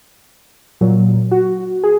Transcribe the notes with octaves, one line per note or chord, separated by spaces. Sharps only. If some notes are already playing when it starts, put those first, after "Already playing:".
A#2 F#3
F#4
G#4